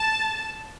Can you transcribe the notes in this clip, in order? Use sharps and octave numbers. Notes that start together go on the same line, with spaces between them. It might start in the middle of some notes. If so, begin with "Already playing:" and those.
Already playing: A5